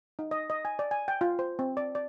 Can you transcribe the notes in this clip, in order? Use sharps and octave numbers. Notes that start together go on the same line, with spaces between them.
D#4
D#5
D#5
G#5
D5
G#5
G5
F4
C5
C4
D5
D5